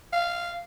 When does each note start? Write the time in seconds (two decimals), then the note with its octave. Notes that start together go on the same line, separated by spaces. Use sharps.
0.12 F5